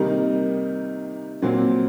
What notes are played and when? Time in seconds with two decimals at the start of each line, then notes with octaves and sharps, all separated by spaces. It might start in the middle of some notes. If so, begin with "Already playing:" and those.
Already playing: C3 D#3 G3 A#3 D#4
1.42 A#2 F#3 C4